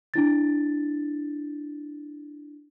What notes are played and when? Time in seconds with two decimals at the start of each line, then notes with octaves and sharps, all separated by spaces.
0.14 D4 E4 A6